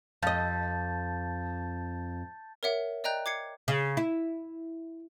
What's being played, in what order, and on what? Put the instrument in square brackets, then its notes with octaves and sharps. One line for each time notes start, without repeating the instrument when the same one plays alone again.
[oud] F2 D#5 [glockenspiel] A5 G6 A6
[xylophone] A#4 C#5 E5 F#5
D5 D#5 G5 A#5 F#6 G6
D6 G#6 C7 C#7
[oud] C#3
E4